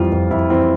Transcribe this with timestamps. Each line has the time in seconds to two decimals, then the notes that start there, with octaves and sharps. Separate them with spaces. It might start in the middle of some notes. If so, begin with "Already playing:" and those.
Already playing: F2 E3 G3 F4
0.12 F2
0.31 F2 E4
0.49 E3 C4